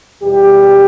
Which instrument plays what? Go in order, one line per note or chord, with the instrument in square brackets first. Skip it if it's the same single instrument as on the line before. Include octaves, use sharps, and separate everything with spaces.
[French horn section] E2 B2 G3 G4